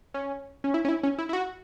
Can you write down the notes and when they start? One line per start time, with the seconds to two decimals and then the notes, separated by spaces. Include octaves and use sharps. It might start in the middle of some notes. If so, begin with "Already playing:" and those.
0.14 C#4
0.64 C#4
0.74 E4
0.85 C#4
0.89 E4
1.03 C#4
1.18 E4
1.29 E4
1.33 F#4